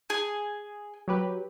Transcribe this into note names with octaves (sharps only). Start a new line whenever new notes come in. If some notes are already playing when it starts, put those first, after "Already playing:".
G#4
F#3 G4 B4